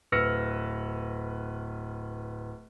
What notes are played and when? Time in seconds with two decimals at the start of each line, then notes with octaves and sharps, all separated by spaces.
0.12 D1 B4 E6 F6 A#6 C#7